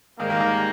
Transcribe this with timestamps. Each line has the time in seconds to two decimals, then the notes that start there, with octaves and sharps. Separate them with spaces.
0.19 G#2 D#3 G3 A#3 D#4
0.30 D#3 D#4
0.41 D#3 D#4